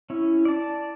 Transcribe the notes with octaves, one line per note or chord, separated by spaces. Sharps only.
C#4 E4
D5 A5